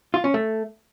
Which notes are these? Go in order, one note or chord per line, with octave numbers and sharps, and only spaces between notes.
F4
C#4
A3